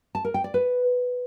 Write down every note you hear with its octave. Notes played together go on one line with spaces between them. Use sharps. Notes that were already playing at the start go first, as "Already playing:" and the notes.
A5
A#4
G5
D5
B4